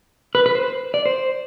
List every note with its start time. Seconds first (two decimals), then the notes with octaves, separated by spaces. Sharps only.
0.35 B4
0.46 B4
0.55 C5
0.94 D5
1.06 C5